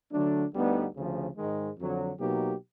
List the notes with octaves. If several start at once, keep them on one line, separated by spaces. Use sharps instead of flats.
D3 F#3 A3 D4
D2 D3 G3 B3 D#4
D2 C#3 F3
G#2 D#3 G#3
F2 D3 F#3
B2 F#3 A#3 D#4 G4